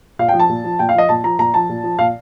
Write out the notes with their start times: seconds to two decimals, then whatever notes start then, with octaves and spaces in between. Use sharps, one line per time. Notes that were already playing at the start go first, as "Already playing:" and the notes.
0.19 A#2 F5
0.29 F3 G5
0.39 A5
0.49 A#2
0.64 F3
0.79 A#2 G5
0.89 F5
0.94 F3 D#5
1.09 A#2 A5
1.24 F3 A#5
1.39 A#2 A#5
1.54 F3 A5
1.69 A#2
1.84 F3
1.99 A#2 F5